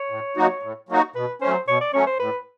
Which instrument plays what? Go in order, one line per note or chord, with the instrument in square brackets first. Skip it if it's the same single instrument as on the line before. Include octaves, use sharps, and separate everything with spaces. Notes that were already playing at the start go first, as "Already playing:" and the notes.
Already playing: [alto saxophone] C#5
[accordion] A2
F#3 A#3 D#4 F#4
A2
F#3 A#3 D#4 F#4
[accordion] B2 [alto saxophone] B4
[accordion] F#3 A3 C#4 [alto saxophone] C5
[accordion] B2 [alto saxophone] C#5
[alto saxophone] D5
[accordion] F#3 A3 C#4 [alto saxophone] C#5
[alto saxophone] C5
[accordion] A2 [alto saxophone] B4